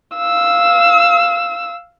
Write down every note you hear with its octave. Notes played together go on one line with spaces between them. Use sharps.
F5 E6